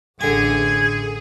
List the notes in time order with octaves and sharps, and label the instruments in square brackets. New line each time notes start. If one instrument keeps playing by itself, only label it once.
[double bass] A1 [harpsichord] D3 G#5 [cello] G#4 [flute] G#6